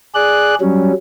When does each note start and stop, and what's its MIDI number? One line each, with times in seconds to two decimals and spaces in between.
0.15 0.55 68
0.15 0.55 74
0.15 0.55 90
0.61 0.92 54
0.61 0.92 55
0.61 0.92 61